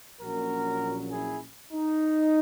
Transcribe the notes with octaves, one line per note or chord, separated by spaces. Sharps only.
A#1 A#2 F#3 C#4 F#4 A#4
E4 G#4
D#4